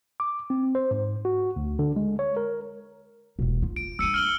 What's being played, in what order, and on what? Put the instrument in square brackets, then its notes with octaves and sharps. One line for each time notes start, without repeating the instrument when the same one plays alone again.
[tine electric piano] D6
C4
C5
G#2
F#4
D2
D3
G#3
C#5
A#4
[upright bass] E1 B2
F4
[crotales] D7
[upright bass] G3 D4 [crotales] E6 C#7 D#7
[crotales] F6 F#7 G7